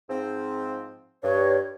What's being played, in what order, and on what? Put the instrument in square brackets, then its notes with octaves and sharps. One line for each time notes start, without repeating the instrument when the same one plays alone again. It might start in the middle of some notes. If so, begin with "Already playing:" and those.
[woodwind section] G#2 F3 C4
[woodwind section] G2 [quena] C#5